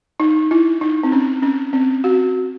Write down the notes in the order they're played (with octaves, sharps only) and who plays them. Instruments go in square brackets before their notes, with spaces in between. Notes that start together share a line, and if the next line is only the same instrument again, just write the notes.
[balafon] D#4
E4
D#4
C4
C#4
C#4
C4
F#4